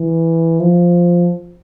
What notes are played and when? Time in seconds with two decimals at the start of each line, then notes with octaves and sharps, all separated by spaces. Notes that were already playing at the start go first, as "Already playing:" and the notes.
Already playing: E3
0.60 F3